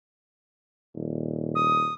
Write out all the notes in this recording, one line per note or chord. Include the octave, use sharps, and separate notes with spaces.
D#1
D#6